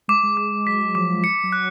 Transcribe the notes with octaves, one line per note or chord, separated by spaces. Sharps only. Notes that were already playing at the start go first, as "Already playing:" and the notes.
G#3 D6
G#3
G#3 D6
G#3
F#3 B6
F3 D6
C#7
F#3
F#6